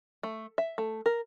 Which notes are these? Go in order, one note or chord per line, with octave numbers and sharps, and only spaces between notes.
A3
E5
A3
A#4